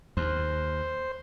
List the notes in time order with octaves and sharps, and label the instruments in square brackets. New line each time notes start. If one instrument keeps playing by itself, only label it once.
[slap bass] D#2 [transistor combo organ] C5